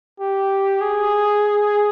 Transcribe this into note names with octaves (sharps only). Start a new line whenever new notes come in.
G4
G#4